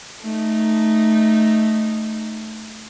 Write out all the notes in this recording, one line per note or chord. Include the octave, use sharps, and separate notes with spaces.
A3 D#4